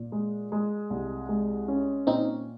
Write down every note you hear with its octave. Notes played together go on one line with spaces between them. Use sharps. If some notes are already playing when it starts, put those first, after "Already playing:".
Already playing: A#2
G#3
G#3
C2
G#3
C#4
A#2 C4 D#4